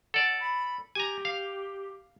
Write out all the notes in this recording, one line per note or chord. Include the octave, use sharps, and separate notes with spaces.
A4 D5 F#5
B5
G4 G#5 A#5
F5